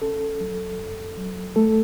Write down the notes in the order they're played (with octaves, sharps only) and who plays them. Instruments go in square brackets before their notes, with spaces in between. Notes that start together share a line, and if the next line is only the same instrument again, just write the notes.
[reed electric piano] C#4 A4
F#3
F#2
F#3
A3 A4